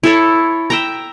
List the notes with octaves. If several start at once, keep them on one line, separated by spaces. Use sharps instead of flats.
E4 A4 C#5
E5 G5 A#5